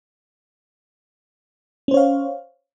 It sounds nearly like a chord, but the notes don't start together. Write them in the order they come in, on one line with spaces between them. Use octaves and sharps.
C#4 C5 C#5 F5